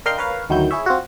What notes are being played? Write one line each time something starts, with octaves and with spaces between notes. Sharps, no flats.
D4 A#4 D#5 F5 G5 C6
A#4 B4 C#5 F5
D2 D#3 F#3 E4 G6
E4 G#4 C#5 E5
C4 F4 F#4